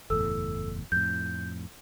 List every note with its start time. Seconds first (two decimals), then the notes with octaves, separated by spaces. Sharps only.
0.10 F#1 E2 A2 A4 E6
0.92 F2 A2 G6